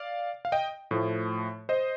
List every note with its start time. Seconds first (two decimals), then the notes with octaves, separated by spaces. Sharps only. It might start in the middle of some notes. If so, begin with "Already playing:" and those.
Already playing: D5 F5
0.45 F5
0.52 D#5 G5
0.91 A2 F3 A3
1.69 C5 D#5